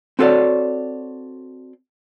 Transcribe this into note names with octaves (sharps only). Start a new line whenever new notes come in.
C4 F#4 A4 C#5 D5